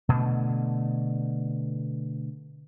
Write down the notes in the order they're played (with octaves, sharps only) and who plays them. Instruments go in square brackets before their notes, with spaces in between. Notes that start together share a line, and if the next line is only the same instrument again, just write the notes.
[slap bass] B2 D3 A3